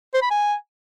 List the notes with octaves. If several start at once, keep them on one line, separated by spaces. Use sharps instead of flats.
C5
B5
G#5